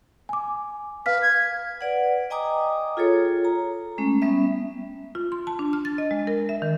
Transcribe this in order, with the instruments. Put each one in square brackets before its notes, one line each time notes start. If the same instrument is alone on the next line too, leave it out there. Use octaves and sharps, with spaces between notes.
[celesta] G#5 D6
[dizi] B4 [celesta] F5 F6 B6
[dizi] G#6
[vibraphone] B4 D5 F#5
D#5 G5 G#5 A#5 D6 D#6
F4 G#4 A4 C#5
A#5
G#3 A3 C#4
G3 B3 C#4 E5
[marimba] F4
C6
A5
D4
F6
A6
D#5
G#3
A#4
E5
D#3